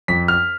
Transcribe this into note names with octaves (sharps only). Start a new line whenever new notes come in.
F2 B6
F6